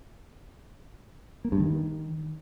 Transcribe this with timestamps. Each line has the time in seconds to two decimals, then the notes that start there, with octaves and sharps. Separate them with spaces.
1.45 A#3
1.52 G2
1.60 D#3